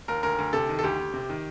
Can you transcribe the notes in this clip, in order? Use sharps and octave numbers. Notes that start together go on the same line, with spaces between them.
D#2 A#4
D2 A#4
D2
C3 A4
D#3
A4
D2 G4
D2
C3
D#3